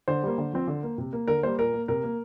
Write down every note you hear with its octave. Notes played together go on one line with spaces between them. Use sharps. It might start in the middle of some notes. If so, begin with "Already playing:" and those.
D3 C5
G3 A#3
D3
F3 C4
D3
A#3
C3
A#3
D3 A#4
G3 A#3 C5
A#2 A#4
A#3
C3 A#4
A#3